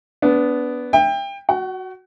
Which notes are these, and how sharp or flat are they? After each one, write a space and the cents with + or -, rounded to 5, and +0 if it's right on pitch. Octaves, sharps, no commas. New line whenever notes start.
B3 +0 D4 -25
E5 +0 G5 +25
F#4 +0 F#5 +40